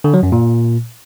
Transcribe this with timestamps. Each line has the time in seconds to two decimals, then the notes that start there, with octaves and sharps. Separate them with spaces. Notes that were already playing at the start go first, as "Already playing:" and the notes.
0.04 D3
0.14 F#3
0.23 F#2
0.32 A#2